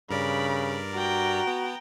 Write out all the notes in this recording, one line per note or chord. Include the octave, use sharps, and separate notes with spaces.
G2 C#3 A#4 D5 B5
F#4 G5 A#5
B3